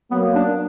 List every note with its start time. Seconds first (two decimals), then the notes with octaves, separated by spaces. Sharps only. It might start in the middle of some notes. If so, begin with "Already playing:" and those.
0.11 F#3 A#3 B3
0.35 D4